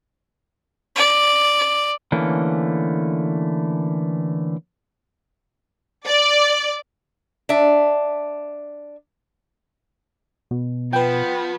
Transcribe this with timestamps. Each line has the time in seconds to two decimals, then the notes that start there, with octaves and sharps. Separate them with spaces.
0.96 D5
2.12 D3 E3 A3 A#3 C#4
6.06 D5
7.49 D4 E5
10.51 B2
10.93 F3 B3 B4 G5